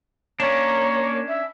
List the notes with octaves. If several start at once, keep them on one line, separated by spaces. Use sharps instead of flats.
A#3 C#4 D4 C#5
E5